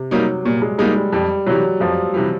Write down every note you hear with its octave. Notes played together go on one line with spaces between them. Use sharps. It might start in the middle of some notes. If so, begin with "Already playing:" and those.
Already playing: C3
F#3 G3 A#3 D#4
A#2 G3
G#3
G3 G#3 A#3 D#4
G3
F2 G3
C3 E3 F#3 G3
F2 F3
C3 E3 G3